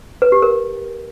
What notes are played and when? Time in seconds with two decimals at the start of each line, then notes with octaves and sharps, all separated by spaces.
0.22 B4
0.32 G4
0.42 A#4